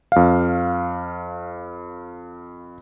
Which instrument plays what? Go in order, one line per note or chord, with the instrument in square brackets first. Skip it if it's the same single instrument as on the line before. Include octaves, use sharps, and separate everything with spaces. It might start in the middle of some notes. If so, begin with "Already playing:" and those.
[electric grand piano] F2 F5